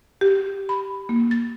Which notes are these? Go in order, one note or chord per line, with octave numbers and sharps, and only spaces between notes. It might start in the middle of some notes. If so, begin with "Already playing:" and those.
G4
B5
A#3
A6